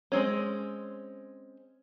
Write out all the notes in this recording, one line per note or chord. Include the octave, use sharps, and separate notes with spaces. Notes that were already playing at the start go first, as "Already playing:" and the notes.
G#3 C4 C#4